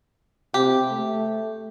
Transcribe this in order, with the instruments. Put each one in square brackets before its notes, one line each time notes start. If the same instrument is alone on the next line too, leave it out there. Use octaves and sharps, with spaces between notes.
[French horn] C3 [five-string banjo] G4
[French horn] A3